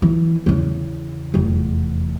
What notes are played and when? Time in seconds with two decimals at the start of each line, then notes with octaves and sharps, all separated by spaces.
0.02 E3
0.46 E2 C#3
1.34 F1 E2